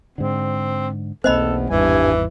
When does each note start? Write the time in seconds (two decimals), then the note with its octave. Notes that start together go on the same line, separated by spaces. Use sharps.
0.18 G#2 D3 C4
1.24 B1 E2 A#3 C4 A4 C5 D#5 B5
1.70 G#1 E2 G2 E3 G3 G#5